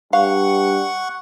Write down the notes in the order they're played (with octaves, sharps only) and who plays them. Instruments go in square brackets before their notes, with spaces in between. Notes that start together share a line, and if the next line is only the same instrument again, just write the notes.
[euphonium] G2 [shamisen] F5 [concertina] F#5 C#6